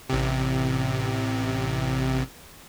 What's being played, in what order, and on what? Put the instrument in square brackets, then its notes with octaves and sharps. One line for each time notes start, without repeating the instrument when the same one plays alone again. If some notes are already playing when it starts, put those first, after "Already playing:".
[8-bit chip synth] A1 C3